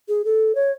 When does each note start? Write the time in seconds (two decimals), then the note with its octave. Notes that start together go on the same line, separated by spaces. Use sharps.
0.09 G#4
0.25 A4
0.55 C#5